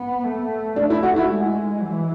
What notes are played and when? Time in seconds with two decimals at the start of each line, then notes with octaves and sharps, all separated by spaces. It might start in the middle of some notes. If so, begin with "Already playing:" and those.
Already playing: B3
0.24 A3
0.76 A3 D4
0.90 E4
1.03 F#4
1.16 E4
1.29 G#3
1.82 E3